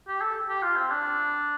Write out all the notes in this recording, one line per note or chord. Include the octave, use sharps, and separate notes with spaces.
G4
A4
G4
F4
C4
D4